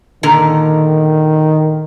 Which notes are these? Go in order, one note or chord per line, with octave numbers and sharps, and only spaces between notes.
A#2 D3 D#3 A#4